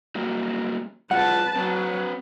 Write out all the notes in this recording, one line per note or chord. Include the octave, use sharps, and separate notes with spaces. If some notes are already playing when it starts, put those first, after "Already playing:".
F#3 G3 A#3
G3 F4 G#4 B4 F#5 A5
F#3 C4 B4